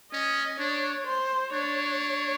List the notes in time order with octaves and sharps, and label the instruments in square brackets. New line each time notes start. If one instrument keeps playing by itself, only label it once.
[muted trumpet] C#4 [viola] D#5
[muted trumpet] D4 [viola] C#5
[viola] C5
[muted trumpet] D4 [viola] C#5